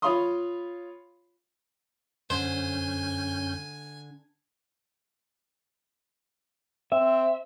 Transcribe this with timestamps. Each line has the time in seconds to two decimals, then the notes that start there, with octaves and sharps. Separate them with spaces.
0.02 F4 C#5 F5 B5 C6 D#6
2.30 F#2 D3 C#4 C5 G#5 G6
6.92 C4 E5